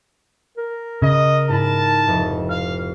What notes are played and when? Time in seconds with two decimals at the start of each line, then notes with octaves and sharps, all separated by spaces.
0.58 A#4
1.02 C#3 D#5
1.49 G#2 E4 A5 B5
2.07 F1 F2 D#5
2.50 F5